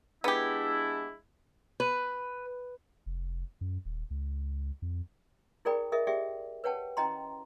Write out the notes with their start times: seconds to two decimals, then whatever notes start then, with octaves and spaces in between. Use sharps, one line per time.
0.24 G#3 B3 D4 E4 G4
1.80 B4
3.06 F1
3.61 F#2
3.85 D#1
4.10 C#2
4.82 F2
5.65 E4 G#4 A#4 D5 G5 B5
5.92 G#4 A#4 D#5 E5
6.07 G4 G#4 D5 E5 G5
6.64 B4 C#5 F#5 G5 A5
6.97 C#4 E4 D#5 G5 A#5 C6